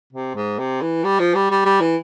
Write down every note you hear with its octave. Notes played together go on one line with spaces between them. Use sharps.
C3
G#2
C3
E3
G3
F3
G3
G3
G3
E3